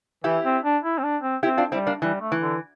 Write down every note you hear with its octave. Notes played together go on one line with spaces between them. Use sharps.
E3 E4 G4
C4
D4
E4
C4
D4
C4
C4 E4 G4
D4 F4
G3 C4 E4
A#3 D4
E3 G3
A3
E3
D3